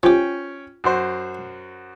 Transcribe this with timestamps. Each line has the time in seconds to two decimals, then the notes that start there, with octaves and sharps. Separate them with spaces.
0.03 F3 C#4 G4 G5
0.84 F#2 F#4 C5